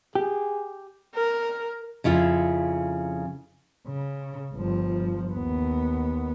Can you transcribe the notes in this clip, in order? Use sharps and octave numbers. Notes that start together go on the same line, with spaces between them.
G4 G#4
A#4
F2 C#3 E4 F4
C#3
G1 F3
D#2 B3